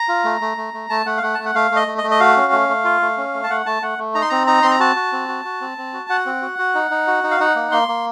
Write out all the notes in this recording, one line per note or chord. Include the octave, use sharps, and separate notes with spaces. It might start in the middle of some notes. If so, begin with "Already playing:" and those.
Already playing: A#5
F4
A3
A3
A3
A3
A3 A5
A3 F#5
F5
A3 F#5
A3 A5
F#5
A3 F5
A3
D#5
A3
D#5
A3
D#5
F#4 F5
C#4
A3
A3
F4
A3
C#4
A3
A5
A3 F#5
A3 A5
A3 F#5
A3
D#4 A#5
C6
C4 A#5
D#4 A#5
C4 C6
A#5
F#4 A5
F#4
C4
F#4
F#4
C4
C4
F#4
F#4 F#5
C4
F#4
F#4
D#4
D#4
F#4
D#4
F5
D#4 F#5
A#3
A#3 C6
A#3